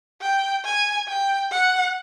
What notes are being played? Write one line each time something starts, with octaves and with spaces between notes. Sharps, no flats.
G5
G#5
G5
F#5